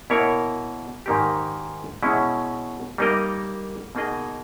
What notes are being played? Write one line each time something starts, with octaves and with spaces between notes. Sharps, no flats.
B2 A#3 E4 A#4 C#5
G#2 D#3 A#3 D#4 G4
B2 G#3 C#4 E4
G3 A#3 D#4 A#4 D#5
B2 A#3 D#4 G#4 D#5